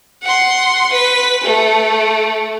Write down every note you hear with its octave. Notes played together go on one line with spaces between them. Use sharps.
F#5 C6
B4 B6
A3